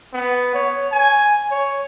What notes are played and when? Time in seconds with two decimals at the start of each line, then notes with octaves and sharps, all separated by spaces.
0.13 B3
0.54 C#5
0.92 G#5
1.51 C#5